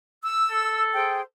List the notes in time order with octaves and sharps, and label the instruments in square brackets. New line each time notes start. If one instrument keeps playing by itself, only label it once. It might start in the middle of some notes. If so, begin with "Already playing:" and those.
[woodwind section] E6
[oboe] A4
[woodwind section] G#4 C5 G5